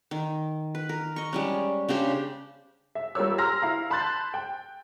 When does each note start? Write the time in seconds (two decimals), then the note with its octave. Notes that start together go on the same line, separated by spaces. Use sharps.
0.11 D#3
0.75 B4
0.89 A#4
1.16 D#5 C#6
1.33 G3 G#3 C#4
1.89 C#3 D4 G4 C5
2.95 E5
3.15 G3 F4 A#4 C#5 E6
3.38 A#5 C6 F6 A#6
3.62 E4 F5 A#5
3.90 A5 B5 C6 F#6 G6 A6
4.34 G5